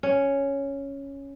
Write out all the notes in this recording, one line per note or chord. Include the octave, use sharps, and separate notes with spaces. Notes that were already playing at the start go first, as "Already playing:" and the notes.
C#4